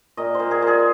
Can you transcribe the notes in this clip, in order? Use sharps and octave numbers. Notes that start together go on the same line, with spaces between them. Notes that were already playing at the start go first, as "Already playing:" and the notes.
A#2 D#5
A#2 C5
G#4
A#2 G#4